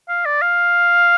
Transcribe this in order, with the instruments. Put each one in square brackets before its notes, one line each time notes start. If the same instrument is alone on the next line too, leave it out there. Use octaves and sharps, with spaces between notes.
[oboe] F5
D5
F5